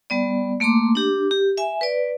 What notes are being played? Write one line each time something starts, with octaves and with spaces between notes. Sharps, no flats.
G3 B3 D5
A3 A#3 A#5 C6 D6
D4 G4
G4
E5 G#5
B4 D5